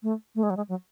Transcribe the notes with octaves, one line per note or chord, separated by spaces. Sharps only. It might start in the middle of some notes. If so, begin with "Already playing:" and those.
A3
A3
G#3
F#3
G#3
F#3